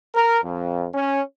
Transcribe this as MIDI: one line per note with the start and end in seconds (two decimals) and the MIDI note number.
0.15 0.39 70
0.44 0.87 41
0.94 1.21 61